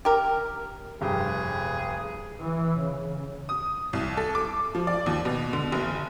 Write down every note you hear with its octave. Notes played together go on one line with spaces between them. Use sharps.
G4 A#4
F1 G2 G4 G#4
E3
C#3
D#6
C2
A4
D6
F3
D5
D#2
B2
D3
F#1